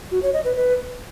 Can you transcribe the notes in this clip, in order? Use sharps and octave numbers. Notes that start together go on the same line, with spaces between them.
F#4
C#5
D#5
B4
B4